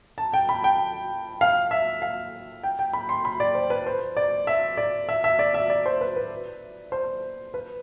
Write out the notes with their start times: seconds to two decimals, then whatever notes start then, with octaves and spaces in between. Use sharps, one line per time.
0.18 A5
0.33 G5
0.49 B5
0.64 G5
1.41 F5
1.71 E5
2.02 F5
2.63 G5
2.79 G5
2.93 B5
3.09 C6
3.25 B5
3.40 D5
3.55 C5
3.70 B4
3.87 C5
4.17 D5
4.47 E5
4.77 D5
5.09 E5
5.24 E5
5.39 D5
5.54 E5
5.70 D5
5.86 C5
6.01 B4
6.16 B4
6.92 C5
7.54 B4